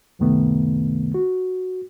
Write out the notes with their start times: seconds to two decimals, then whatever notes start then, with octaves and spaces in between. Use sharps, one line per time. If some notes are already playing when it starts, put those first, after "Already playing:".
0.19 C#2 F#2 C3 D#3 A3 B3
1.14 F#4